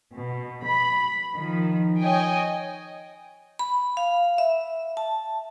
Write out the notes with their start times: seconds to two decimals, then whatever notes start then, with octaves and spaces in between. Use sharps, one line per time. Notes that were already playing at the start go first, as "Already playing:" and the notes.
0.16 B2
0.65 B5
1.36 D#3 F3
1.99 C#5 D#5 G5 G#5
3.59 B5
3.97 F5
4.38 E5
4.97 A5